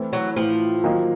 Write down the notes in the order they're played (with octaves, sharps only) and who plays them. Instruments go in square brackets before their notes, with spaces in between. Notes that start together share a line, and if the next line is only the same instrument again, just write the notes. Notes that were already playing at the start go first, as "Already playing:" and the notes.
Already playing: [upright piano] E3 A3 C4 E4
[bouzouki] F#3
[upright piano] A2 E3 A3 [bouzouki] F3
[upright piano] D#3 F#3 A#3 D#4